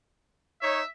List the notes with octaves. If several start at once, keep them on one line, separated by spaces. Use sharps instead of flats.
D#4 C#5 E5